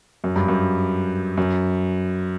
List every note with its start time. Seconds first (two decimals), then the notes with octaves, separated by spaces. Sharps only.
0.24 F#2
0.36 G2
0.48 F#2
1.37 F#2